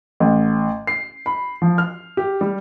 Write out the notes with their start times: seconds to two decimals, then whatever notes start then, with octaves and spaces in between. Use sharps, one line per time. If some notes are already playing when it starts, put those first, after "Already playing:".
0.20 A1
0.87 C7
1.26 B5
1.62 F3
1.78 F6
2.17 G4
2.41 G3